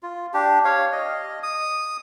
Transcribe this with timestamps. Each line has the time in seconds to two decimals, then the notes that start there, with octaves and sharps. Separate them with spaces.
0.03 F4
0.34 D4 G4
0.65 C#5 F5
0.92 D#5
1.43 D#6